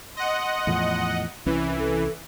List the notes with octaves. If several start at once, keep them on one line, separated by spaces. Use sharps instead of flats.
D#5 F#5 C6
E2 A2 F3
C2 E3 C#4 E4
A4